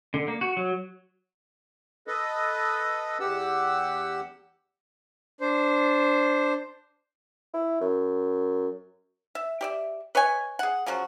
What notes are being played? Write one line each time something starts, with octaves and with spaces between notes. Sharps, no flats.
D3
A#3
F#4
F#3
A4 B4 D#5
E2 G4 F#5 E6
D4 C5
E4
F#2
E5
G4 D5 E5
B4 C#5 D#5 G#5
G#4 F#5
C#3 F3 F#3 F#4